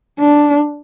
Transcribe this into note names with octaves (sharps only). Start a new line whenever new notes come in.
D4